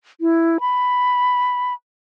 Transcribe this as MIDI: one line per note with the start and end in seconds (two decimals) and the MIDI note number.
0.21 0.58 64
0.60 1.73 83